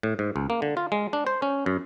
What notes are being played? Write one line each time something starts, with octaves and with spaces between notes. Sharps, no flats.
A2
G#2
C#2
A#3
D3
F4
G#3
D4
C5
C#4
F#2